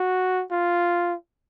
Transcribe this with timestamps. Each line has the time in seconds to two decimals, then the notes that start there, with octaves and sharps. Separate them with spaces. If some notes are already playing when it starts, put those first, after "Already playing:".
Already playing: F#4
0.51 F4